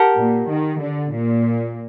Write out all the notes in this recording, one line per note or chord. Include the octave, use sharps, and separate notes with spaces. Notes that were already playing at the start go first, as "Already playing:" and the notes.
Already playing: G4 A#4 F#5 A5
A#2
D#3
D3
A#2